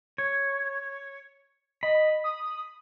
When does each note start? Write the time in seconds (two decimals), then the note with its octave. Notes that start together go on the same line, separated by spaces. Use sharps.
0.18 C#5
1.83 D#5 B5
2.24 D#6